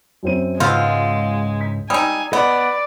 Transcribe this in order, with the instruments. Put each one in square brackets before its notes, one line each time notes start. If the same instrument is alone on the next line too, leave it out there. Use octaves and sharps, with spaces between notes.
[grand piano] F#2 C4 D#7
[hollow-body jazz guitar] C#2 G#2 [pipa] B2 F4 [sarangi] G#3 [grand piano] D#6 E6 G6
[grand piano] B6
[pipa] G3 D#4 [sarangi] G#5 [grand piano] D#6 E6
[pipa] B3 [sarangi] D5 [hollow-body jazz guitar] D#5